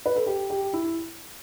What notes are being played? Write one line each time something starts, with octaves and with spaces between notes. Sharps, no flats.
B4
A4
G4
G4
E4